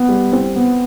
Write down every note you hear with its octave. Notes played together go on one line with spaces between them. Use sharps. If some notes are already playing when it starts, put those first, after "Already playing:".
Already playing: B3
G3
C4
B3